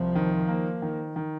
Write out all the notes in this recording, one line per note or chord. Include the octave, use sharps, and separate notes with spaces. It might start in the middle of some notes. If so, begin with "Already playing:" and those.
Already playing: C2 F3
D#3
A#3
D#3
D#3